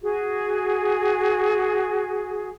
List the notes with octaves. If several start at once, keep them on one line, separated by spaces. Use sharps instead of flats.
F#4 G#4